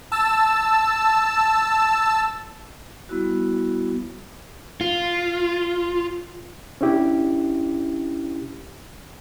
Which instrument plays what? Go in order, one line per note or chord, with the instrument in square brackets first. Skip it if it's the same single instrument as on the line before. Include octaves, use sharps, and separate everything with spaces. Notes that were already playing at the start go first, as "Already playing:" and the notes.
[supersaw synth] A5 E6
[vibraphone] G3 B3 E4 F#4
[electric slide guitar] F4
[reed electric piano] C#4 D4 E4 G4